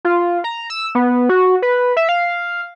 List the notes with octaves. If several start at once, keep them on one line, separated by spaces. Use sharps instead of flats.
F4
A#5
E6
B3
F#4
B4
E5
F5